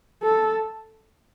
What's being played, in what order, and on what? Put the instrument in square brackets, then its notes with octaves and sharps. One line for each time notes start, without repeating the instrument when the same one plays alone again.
[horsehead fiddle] A4